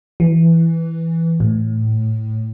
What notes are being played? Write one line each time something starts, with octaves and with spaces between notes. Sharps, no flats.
E3
A2